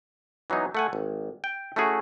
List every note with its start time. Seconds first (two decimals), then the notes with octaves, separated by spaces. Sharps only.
0.50 E3 F#3 B3 D#4
0.75 A3 F#5 G#5
0.93 G#1
1.44 G5
1.76 A3 C#4 E4 F#4 G#4